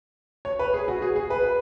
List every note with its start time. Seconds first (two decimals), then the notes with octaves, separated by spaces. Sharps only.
0.45 C#5
0.59 B4
0.74 G#4
0.88 F#4
1.02 G#4
1.16 G#4
1.30 B4